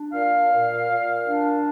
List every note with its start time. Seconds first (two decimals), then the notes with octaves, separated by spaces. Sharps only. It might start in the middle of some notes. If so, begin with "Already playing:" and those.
Already playing: D4
0.12 A#2 F5
0.50 A#2
0.88 A#2
1.27 D4